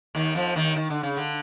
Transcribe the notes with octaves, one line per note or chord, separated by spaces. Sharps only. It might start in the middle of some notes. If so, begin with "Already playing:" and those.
D#2 D#3
F2 F3
D#2 D#3
D#3
D3
C#3
D3